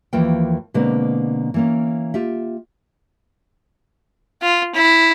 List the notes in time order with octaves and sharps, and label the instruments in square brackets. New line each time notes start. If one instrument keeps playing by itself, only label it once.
[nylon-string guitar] D#2 E3 F3 A#3 A#4 G5
B2 D3 G#3 A#3 C4
E3 A#3 C#4
F4 G4 E5
[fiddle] F4
E4